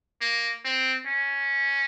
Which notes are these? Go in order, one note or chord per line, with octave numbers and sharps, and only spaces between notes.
A#3
C4
C#4